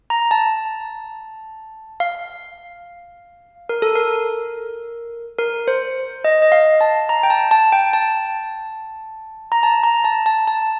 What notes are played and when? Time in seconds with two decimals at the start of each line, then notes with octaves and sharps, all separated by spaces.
0.10 A#5
0.31 A5
2.00 F5
3.69 A#4
3.82 A4
3.95 A#4
5.39 A#4
5.68 C5
6.25 D#5
6.42 D#5
6.52 F5
6.81 A5
7.09 A#5
7.23 G5
7.30 A5
7.51 A5
7.72 G5
7.93 A5
9.52 A#5
9.63 A5
9.84 A#5
10.05 A5
10.26 A5
10.48 A5